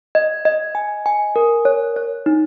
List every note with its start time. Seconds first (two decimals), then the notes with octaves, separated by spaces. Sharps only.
0.15 D#5
0.45 D#5
0.75 G#5
1.06 G#5
1.36 A#4
1.65 C#5
1.96 C#5
2.26 D#4